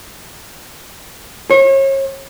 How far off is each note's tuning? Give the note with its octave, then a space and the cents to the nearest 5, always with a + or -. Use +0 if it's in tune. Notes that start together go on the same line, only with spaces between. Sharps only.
C#5 -35